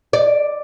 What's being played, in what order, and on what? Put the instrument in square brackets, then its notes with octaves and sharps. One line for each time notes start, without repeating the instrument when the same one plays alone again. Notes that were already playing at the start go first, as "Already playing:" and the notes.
[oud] D5